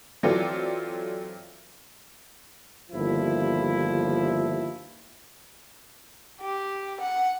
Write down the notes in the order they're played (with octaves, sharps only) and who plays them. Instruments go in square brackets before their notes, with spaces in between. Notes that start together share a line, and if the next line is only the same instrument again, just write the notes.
[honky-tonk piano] E3 F#3 C4 F4 A4 D5
[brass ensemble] G1 D#2 F3 E4
[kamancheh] G4
F#5